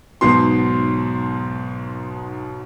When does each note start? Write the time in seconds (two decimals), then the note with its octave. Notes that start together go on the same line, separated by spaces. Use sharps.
0.21 B1 G#2 B2 C6